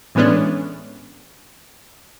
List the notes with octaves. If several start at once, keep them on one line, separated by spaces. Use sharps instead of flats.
A2 E3 G#3 B3 C#4 D4